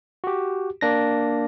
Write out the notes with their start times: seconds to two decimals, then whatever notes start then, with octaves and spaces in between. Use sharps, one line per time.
0.24 F#4 G4
0.81 A#3 D4 A#6